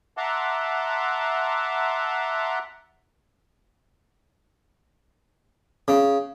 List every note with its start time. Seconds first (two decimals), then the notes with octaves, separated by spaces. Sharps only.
0.17 E5 F#5 A5 A#5 C6 D6
5.88 C#3